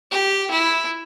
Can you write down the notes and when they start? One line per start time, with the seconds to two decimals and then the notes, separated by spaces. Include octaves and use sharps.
0.11 G4
0.51 E4